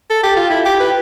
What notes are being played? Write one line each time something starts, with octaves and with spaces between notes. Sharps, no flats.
A4
G4
F4
E4
G4
B4